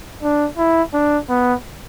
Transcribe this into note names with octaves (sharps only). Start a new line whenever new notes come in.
D4
E4
D4
B3